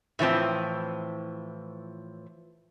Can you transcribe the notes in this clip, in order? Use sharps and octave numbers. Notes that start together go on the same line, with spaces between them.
A2 E3 F3 C4